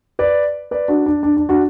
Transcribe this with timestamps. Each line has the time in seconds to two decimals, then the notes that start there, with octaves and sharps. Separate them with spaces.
0.19 B4 D5
0.71 B4 D5
0.88 D4 F#4
1.06 D4
1.23 D4
1.37 D4
1.49 D4 F#4